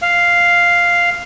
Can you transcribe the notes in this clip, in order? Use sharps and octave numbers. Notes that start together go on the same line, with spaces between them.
F5